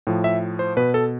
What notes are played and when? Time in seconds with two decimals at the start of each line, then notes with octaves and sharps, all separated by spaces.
0.07 A2 F3
0.24 E5
0.59 C5
0.77 B2 B4
0.94 A4